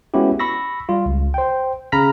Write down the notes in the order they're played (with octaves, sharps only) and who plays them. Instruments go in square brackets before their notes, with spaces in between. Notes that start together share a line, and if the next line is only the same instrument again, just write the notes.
[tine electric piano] G#3 B3 C#4 E4 F#4 G4
B5 C#6 E6 A#6
G3 F4
C#2
C5 G5
C#3 A#5 B5 F6 B6